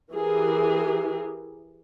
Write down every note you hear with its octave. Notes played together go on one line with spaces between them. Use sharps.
E3 G4 G#4 A#4